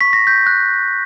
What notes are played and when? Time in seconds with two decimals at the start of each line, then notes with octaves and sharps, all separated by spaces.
0.01 C#6 B6
0.13 A#6
0.27 G6 B6
0.46 F#6